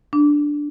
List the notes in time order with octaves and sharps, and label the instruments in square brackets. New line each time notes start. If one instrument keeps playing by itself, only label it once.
[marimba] D4